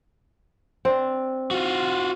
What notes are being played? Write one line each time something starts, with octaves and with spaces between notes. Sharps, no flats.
C4 D4
F4 F#4